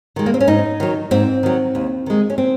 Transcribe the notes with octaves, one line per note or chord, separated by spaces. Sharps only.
D#3 G#3
A#3
C4
C#4
G#2 D#4
D#3 F#3
G#2 C4
D#3 F#3
D#2
D#3 G#3
C#4
C4